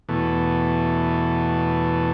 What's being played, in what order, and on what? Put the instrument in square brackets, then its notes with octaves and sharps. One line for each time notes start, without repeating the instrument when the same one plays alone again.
[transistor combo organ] E2 B2 A3